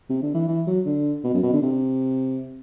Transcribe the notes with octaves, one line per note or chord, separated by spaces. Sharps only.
C3
D3
E3
E3
F#3
D3
B2
F#2
B2
D3
C3